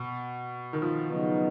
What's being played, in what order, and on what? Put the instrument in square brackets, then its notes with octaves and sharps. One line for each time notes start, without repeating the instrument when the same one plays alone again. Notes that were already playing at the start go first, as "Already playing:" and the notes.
Already playing: [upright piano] B2
D#3
F3
[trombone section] C#3 F#3 B3 D#4